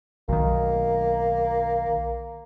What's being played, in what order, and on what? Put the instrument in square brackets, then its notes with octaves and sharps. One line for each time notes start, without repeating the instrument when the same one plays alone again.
[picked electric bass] B1 D#3 [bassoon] A#3